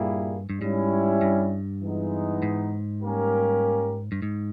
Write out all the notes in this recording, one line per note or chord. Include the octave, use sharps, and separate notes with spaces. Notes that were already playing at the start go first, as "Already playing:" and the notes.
Already playing: G2 A#2 G3 A#3 E4 G#4
G2
G#2 G3 C#4 E4
G2
E3 G#3 B3 D#4
G#2
G3 A#3 C#4 G4 A#4
G2
G#2